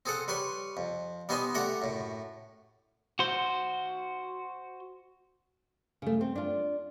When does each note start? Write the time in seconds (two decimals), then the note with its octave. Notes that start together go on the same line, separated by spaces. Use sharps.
0.06 C4 G#4 A4 F#5
0.28 G3 B4 C#5 C6
0.77 F2
1.29 G3 B3 D#4 C5 G#5 C6
1.54 D3 A3 G4 F#5 G5 A#5
1.82 F#2 A2
3.19 F#4 C5
6.02 C#3 A3
6.21 C4
6.35 D4 F4